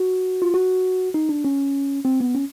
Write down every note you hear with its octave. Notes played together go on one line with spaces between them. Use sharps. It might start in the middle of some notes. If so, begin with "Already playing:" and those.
Already playing: F#4
F4
F#4
D#4
D4
C#4
C4
B3
C#4